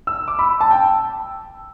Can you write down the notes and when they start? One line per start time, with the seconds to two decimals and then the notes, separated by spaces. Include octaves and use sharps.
0.07 E6
0.28 D6
0.39 B5
0.61 A5
0.71 G5